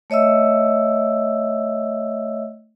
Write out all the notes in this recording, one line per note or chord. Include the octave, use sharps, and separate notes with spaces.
A3 C#5 D#5 E5 E6